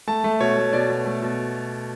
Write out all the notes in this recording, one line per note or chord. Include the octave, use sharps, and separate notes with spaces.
A3 A5
A3
B2 C#5
A3
B2 D5
B2
A3
B2